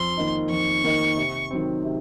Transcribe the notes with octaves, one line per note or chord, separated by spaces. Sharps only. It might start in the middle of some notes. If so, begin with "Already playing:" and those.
Already playing: F2 C6
D#3 A#3 D#4
F2 C#6
D#3 A#3 D#4
C3
D#3 F#3 C4
C3